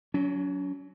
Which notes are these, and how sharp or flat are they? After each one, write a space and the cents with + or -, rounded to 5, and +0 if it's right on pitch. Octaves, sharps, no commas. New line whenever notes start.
F#3 +0 C#4 +40